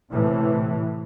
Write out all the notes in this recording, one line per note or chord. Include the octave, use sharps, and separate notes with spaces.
A2 C3 E3